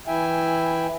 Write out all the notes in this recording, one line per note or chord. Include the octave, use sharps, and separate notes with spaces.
E3 E4 E5 G5 G#5